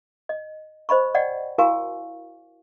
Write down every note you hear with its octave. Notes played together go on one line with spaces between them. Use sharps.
D#5
C5 D#5 B5 C#6
D5 D#5 F#5 G5
E4 F#4 A#4 F5 G#5 C#6